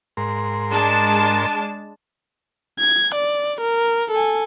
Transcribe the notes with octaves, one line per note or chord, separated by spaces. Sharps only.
G#2 A#4 C6
G#3 D4 A5
G#6
D5
A#4
A4 G#5